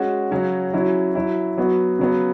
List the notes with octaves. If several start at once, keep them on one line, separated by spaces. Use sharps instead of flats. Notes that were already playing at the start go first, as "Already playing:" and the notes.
Already playing: G#3 C#4 F#4
C#3 F#3 C#4 F#4
C#3 F#3 C#4 E4
F#3 C#4 E4
F#3 B3 F#4
C#3 F#3 B3